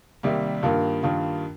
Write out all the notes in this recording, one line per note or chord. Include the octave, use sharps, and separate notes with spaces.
C3 D#3 G3 A#3
G2 D#3 A#3 F4
G2 D#3 A#3 F4